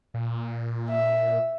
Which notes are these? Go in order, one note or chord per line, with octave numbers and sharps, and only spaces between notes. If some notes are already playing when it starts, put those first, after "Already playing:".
A#2
E5